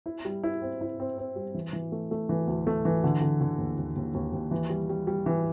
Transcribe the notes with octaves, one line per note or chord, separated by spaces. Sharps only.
E4
G3
E4
C4
E4
C4
C4
G3
E3
E3
A3
A3
E3
D2
A3
E3
D3
D3
D3
D#2
D#2
D#2
D#2
D#2
E3
G3
G3
G3
E3